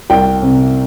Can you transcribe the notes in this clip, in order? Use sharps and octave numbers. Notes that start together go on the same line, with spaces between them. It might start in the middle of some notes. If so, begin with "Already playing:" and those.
C2 G5
C3